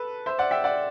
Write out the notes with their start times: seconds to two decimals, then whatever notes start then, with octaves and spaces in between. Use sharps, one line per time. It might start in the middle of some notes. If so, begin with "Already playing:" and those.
Already playing: A4 B4
0.26 C5 E5
0.38 D5 F#5
0.51 E5 G5
0.64 D5 F#5